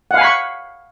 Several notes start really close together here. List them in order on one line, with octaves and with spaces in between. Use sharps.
F#5 F5 G#5 B5 C#6